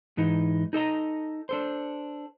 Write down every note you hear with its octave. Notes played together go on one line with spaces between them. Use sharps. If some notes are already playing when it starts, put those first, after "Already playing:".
G#2 E3 D#4
D#4 A4 D#5 A#5
D4 A4 C5